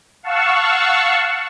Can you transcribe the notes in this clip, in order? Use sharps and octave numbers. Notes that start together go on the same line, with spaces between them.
F5 F#5 A5 C#6 E6